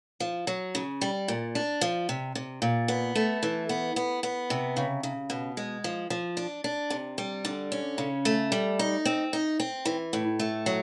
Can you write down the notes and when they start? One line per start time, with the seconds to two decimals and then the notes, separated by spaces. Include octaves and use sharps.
0.20 F3
0.47 F#3
0.75 C#3
1.01 G3
1.28 A#2
1.55 D4
1.81 F3
2.09 C3
2.35 C3
2.62 A#2
2.88 B3
3.15 A3
3.43 E3
3.69 B3
3.96 B3
4.23 B3
4.50 C3
4.77 C#3
5.03 C#3
5.30 B2
5.57 G#3
5.84 F3
6.10 F3
6.37 D4
6.64 D4
6.90 C3
7.18 G3
7.45 D3
7.72 C#4
7.98 C#3
8.25 A3
8.52 G3
8.79 D#4
9.05 C4
9.33 D#4
9.60 C4
9.85 E3
10.13 A2
10.40 A3
10.66 F#3